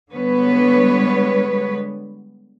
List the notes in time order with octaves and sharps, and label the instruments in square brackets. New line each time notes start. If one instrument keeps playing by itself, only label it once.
[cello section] D3 G3 G#3 B3 B4 C#5